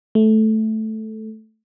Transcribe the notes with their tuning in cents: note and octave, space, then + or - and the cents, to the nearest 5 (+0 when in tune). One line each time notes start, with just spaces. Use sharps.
A3 -10